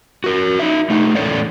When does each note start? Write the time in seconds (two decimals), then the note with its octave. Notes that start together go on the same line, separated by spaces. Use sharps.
0.24 F#4 A#4
0.59 D#4 E5
0.90 A3 D#4
1.15 E2 A2 C#4 A4 C#5 D5